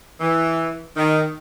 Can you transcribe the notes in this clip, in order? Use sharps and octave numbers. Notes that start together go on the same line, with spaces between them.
E3
D#3